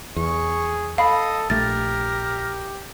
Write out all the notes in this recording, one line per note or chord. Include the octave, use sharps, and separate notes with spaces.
E2 G#4 C#6
A4 D#5 F5 B5
A#1 A3 G4 A#4 A6